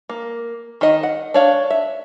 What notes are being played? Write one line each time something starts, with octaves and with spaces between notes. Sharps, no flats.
A#3
D#3 D#5
F#5
D4 C#5 F5
E5